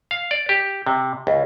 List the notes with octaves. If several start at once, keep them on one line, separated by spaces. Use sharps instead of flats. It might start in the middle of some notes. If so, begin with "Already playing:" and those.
F5
D5
G4
C3
C#2